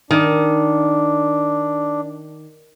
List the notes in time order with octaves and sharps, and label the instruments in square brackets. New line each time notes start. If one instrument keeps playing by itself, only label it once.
[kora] D#3 [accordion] D4